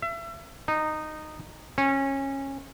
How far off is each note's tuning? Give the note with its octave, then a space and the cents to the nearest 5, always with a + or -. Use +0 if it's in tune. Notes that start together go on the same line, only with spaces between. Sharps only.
E5 +30
D#4 -15
C#4 -20